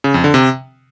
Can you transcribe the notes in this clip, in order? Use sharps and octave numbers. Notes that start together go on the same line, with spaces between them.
C#3
F2
D3
C3